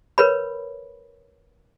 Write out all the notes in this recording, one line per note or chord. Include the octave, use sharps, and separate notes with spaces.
A#4 B4 C#5 B5